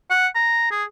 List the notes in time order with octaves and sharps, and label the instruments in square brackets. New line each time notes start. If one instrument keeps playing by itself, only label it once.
[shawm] F#5
A#5
G#4